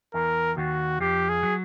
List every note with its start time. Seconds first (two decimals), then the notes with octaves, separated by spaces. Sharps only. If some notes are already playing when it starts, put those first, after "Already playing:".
0.14 E2 E3 A#4
0.57 D#2 D#3 F#4
1.00 F2 F3 G4
1.29 G#4
1.43 F#3